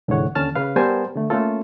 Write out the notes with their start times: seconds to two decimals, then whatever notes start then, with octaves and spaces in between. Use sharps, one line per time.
0.08 C2 G#2 D3 E3 C#5 F#5
0.35 D#2 D3 C#4 A5 F6
0.55 C#3 B4 F5
0.76 G3 B3 A#4 C5 G#5 A5
1.15 D3 A3
1.30 A3 A#3 C#4 F4 A4